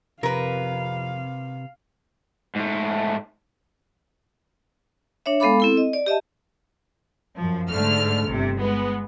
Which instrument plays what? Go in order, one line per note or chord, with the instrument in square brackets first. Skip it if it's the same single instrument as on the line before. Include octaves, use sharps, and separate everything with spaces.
[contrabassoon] F2 [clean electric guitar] C3 [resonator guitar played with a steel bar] A#4 B4 [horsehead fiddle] F5
[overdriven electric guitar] G#2 A3
[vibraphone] D4 C#5 E5
G#3 B3 A4 F5 B5 D6
C4 E4 A4
D#5
D5
G4 D#5 E5 A5
[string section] F#2 F3
G#2 D3 A3 F6
G1 C3
G#3 B3